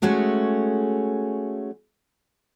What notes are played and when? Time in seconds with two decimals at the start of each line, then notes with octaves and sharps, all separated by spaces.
0.02 G#3 A3 C#4 F#4 G#4